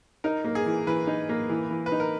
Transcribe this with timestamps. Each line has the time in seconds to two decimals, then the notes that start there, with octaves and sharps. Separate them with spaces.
0.24 D#4 A#4
0.45 A#3
0.55 G#4
0.66 E3
0.87 E3 B4
1.07 D#4
1.29 A#3
1.49 E3
1.71 E3
1.86 B4
1.92 D#4
2.00 A#4